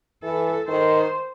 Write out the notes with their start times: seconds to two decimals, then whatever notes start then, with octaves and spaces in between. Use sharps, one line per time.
0.23 E3 A4
0.68 D#3 C5